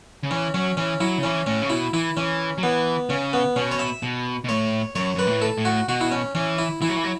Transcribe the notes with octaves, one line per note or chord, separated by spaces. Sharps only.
C#3
E3 C#4
F#3 C#4
E3 C#4
F#3 E4
C#3
E3 C#4
A2 C#4
C#3
B2 E4
E3 E4
E3 C#4
F#3
E3 B3
C#3 C#4
B3
B2 C#4
C#5
E5
B2
B2
A2 C#5
F#2 C#5
F#2 B4
A2
A4
A2
F#4
B2 F#4
E4
C#4
E3 C#4
E4
E3 E4
F#3
E3
F#3